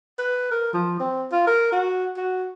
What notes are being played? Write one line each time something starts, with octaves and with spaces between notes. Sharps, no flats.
B4
A#4
F3
C4
F4
A#4
F#4
F#4